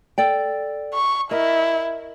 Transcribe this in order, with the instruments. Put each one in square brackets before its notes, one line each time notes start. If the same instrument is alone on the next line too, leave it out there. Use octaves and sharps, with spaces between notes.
[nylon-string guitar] A4 D5 G5
[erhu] C#6
[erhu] E4 [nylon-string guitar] A#4 D#5